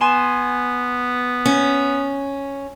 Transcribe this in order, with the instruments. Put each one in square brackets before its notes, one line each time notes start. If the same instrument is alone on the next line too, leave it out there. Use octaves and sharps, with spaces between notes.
[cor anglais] B3 [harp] G#5 C6 E7
[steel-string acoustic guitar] C#4